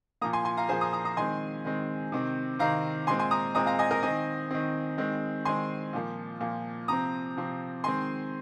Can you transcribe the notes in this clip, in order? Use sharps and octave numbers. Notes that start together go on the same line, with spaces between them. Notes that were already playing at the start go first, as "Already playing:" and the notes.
A#2 F3 A#3 A#5 D#6
G#5 C6
G#5 C6
F5 A#5
A#2 F3 A#3 G#4 C5
A#5 D#6
A#5 D#6
A#5 D#6
D#3 G#3 C4 G#5 C6
D#3 G#3 C4
C3 D#3 C4
C3 D#3 C4 F5 A#5
A#2 G#3 C4 G#5 C6
G#5 C6
A#5 D#6
A#2 G#3 C4 A#5 D#6
F5 A#5
D#5 G#5
A#4 D#5
D#3 C4 D#5 G#5
D#3 C4
D#3 G#3 C4
D#3 G#3 C4 G#5 C6
A#2 F3 A#3
A#2 F3 A#3
C3 F3 C4 A#5 D#6
C3 F3 C4
D#3 G#3 C4 G#5 C6